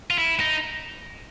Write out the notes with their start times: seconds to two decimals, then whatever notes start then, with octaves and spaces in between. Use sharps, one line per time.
0.10 F4
0.18 E4
0.40 D#4